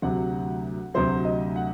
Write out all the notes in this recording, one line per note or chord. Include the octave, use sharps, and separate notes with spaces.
D2 C3 F#3 F#5
D2 C3 F#3 C5
D#5
F#5